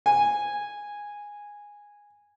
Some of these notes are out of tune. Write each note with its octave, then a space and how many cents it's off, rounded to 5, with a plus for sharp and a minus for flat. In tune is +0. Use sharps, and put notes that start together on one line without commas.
G#5 -10